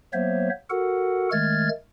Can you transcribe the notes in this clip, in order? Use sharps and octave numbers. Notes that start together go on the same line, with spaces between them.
F#3 A#3 B3 C5 C#5 E5
F#4 A4 A#4 F#5
D#3 G#3 A3 F6 G#6 A6